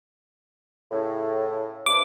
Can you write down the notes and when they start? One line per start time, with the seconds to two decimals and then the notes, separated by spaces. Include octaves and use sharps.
0.92 A2 C#3
1.86 G2 C3 D6